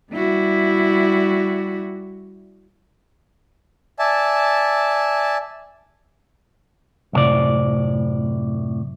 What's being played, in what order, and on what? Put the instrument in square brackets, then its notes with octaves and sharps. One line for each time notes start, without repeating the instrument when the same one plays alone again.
[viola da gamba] G3 E4 F#4
[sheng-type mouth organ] D5 E5 G#5 A5
[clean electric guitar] B1 F#2 A2 C3 D5